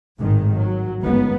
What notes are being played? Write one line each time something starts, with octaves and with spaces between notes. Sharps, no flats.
G#1 A2 D#3 G#3
F#3
G1 C#2 D#3 B3